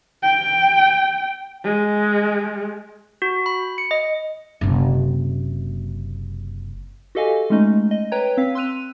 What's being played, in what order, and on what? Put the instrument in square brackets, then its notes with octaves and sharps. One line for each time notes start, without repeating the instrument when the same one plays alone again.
[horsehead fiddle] G5
G#3
[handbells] F#4
B5
C#7
D#5
[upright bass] F#1 C3
[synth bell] F#4 G4 A4 D#5 F5 G#5
G#3 A3 C#4 D#4 D#5
D#5
B4 C#5 G5 A#5 G#6
C4 F5 B6
C6 E6 F#6 D#7 F7